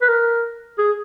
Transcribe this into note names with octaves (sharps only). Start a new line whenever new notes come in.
B4
A#4
G#4